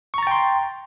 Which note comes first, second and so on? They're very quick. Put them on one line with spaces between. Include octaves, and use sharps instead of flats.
C#6 A#5 A6 G5 C6